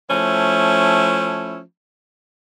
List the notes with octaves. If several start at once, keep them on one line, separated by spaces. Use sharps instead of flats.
F3 A3 C#4 E4